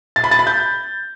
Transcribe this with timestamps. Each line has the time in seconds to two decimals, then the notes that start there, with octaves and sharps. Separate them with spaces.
0.16 A6
0.24 B5
0.31 A6
0.39 B5
0.47 G6